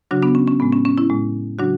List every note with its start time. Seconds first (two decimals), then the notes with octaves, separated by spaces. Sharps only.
0.11 C#3 F#3 D4 F#4
0.22 B3 D4
0.35 C#4
0.47 C#4
0.60 A2 G#3 B3
0.72 C#4
0.85 C#4
0.98 C#4 E4
1.09 A2 G#3
1.59 C#3 F#3 D4 F#4